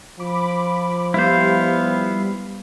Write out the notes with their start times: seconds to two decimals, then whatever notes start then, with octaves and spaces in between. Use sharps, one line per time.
0.19 F3 B5 D6
1.14 G3 B3 E4 C5 F5